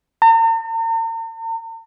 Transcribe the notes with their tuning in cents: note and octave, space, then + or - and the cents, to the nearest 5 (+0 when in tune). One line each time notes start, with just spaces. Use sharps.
A#5 -45